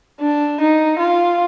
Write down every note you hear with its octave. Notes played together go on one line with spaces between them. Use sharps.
D4
D#4
F4